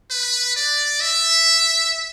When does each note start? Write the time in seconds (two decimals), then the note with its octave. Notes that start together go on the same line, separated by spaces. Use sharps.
0.11 B4
0.56 D5
1.00 E5